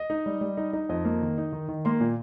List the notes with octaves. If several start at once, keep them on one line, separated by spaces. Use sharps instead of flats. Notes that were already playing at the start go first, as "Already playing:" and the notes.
Already playing: D#5
D#4
G3
G3
D#4
D#4
F2 D#5
A#3
D#3
D#4
D#3
D#3
A#3 C6
A#2